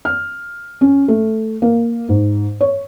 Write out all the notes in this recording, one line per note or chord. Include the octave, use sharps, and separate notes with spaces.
F6
C#4
A3
A#3
G#2
C#5